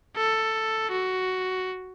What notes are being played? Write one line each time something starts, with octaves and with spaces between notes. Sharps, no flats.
A4
F#4